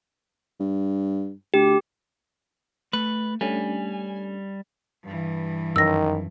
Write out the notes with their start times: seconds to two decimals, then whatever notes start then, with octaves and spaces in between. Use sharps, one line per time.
0.60 G2
1.54 D2 G4
2.93 A3 B4
3.41 G3 A3 C#4 D4 G#5
5.04 G2 E3
5.76 F#2 D#3 E6 A#6